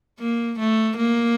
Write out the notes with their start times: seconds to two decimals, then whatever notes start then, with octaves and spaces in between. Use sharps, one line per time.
0.19 A#3
0.59 A3
0.97 A#3